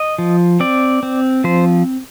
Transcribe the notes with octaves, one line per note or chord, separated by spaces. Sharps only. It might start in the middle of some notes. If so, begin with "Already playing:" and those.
Already playing: D#5
F3
C4 D5
C4
F3 C5